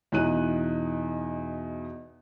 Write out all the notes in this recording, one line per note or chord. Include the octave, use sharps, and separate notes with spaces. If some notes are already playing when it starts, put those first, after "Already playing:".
E2 B2 D#4 F#6 D#7